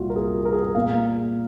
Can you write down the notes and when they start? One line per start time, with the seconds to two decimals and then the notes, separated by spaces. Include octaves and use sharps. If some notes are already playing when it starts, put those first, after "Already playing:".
Already playing: C2 A#2 F4 F#4
0.10 A#4
0.16 G#4
0.45 A#4
0.53 G#4
0.60 A#4
0.75 A#2 F5